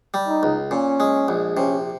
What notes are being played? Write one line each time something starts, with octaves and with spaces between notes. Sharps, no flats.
G3
D#4
C#2
A#2 C#4
G#3
A#1
C3 C#4